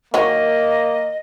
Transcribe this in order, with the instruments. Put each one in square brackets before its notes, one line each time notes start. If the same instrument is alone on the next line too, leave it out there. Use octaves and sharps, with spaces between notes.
[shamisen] D#3 F#3 [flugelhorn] A#3 [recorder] D#5